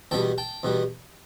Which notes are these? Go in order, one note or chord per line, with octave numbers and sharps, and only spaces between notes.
E2 B2 G3 B3 G5 A5
G5 A5
E2 B2 G3 B3